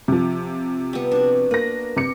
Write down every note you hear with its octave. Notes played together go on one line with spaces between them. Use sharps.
C3 F3
G3 B3
D4 F#4
A#3 B4 A#6
C3 D6 C#7